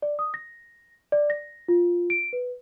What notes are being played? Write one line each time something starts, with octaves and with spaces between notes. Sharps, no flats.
D5
D#6
A#6
D5
A#6
F4
D7
B4